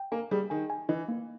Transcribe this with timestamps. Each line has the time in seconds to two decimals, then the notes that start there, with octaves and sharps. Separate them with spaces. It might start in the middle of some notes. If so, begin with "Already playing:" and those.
Already playing: G5
0.12 A#3 G#5
0.31 G3 G#4
0.50 D#3 G#5
0.70 G#5
0.89 E3 D#5
1.08 A#3